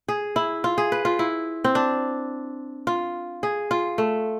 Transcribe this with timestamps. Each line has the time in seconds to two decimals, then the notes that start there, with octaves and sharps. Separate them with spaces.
0.08 G#4
0.36 E4
0.64 F4
0.78 G#4
0.92 B4
1.05 F4
1.19 E4
1.64 C4
1.75 D4
2.87 F4
3.43 G#4
3.71 F4
3.98 A3